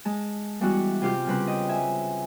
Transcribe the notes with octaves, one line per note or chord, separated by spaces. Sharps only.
G#3 A5
E3 G3 G#3 B3 E4 F#4
C3 F4 G4 F6 G6
C#3 G3 C4 B4
D#5 G5
E5 G#5